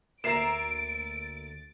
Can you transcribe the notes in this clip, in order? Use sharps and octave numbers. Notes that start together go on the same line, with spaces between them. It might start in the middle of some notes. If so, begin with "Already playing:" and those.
D2 A#3 E5 A#5 A6 C7 D7 E7